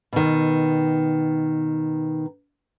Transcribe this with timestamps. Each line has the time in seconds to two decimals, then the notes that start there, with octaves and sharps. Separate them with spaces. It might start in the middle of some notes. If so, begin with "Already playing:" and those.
0.13 B2 D#3